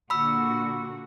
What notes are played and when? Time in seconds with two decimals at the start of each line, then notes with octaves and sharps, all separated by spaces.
0.10 A#2 D3 F#4 B5 E6